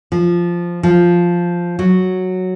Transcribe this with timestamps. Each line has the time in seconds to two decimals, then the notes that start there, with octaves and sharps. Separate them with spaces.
0.12 F3
0.83 F3
1.79 F#3